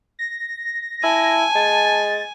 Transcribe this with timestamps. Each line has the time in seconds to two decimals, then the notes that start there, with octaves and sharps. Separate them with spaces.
0.19 A#6
1.04 E4 G#5 A5
1.55 G#3 A6